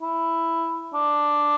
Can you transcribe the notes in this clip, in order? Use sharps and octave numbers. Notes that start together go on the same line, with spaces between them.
E4
D4